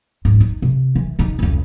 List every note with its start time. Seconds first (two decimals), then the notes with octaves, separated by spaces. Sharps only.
0.25 G#2
0.40 D#4
0.62 C3
0.95 E3
1.19 C#3 D#4
1.39 F1 C#2